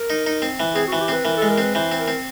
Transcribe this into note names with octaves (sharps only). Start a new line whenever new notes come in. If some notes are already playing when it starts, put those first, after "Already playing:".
Already playing: A#4
D#4
D#4
C4
E3
C4 G#4
F#4
E3
G4
C4 B4
E3 A#4
A4
G#3
A#4
C4 B4
E3 C5
C4
A#4
C4